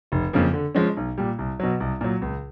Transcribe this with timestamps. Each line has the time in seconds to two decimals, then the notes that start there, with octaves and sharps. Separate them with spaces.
0.12 F1
0.33 F2 C#3 F3 A#3
0.54 D3
0.75 F3 G#3 C#4
0.97 B1
1.18 A#2 G3
1.39 C2
1.60 B2 F#3
1.80 C2
2.01 A#2 F#3
2.22 C#2